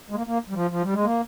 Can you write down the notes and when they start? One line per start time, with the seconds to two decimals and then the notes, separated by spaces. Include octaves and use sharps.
0.10 G#3
0.15 A#3
0.27 A#3
0.49 G3
0.55 F3
0.71 F3
0.82 G3
0.94 G#3
1.04 A#3